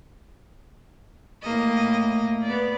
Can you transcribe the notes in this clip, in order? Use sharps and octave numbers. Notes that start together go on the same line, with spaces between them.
A2 A#3 D#5
B3 D5